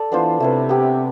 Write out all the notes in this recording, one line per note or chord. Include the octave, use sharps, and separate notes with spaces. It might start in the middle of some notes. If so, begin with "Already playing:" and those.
Already playing: A4 D5
E3 B3 D4 F4 C5
C3 A3 E4 B4
B3 E4 G4